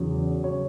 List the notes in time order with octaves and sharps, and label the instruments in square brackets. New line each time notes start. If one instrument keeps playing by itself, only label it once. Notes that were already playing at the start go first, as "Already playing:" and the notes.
Already playing: [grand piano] E2 C#3 F#3
C#3 F#3 C#5